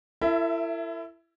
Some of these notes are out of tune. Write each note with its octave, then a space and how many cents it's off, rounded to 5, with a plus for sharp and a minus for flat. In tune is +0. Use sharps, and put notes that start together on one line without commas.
E4 +30 A4 +45 E5 +0